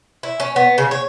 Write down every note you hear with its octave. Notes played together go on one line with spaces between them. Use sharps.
E4
C#4
B3
C#3
C#5